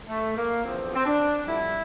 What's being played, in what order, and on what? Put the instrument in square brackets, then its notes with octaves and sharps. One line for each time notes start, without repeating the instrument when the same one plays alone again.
[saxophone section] A3
A#3
E2 D3 F3 C4
C4
D4
F2 D3 G3 E4